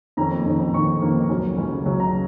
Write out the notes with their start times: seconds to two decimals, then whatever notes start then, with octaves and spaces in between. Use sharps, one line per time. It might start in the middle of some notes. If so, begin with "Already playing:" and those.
0.17 F2 D#3 A#3 C#4 A#5
0.46 F2 D#3 A#3 C#4
0.74 F2 D#3 A#3 C#4 C#6
1.01 F2 D#3 A#3 C#4
1.29 C#2 C#3 F#3 C#4
1.58 C#2 C#3 F#3 C#4
1.86 C#2 C#3 F#3 C#4
2.00 A#5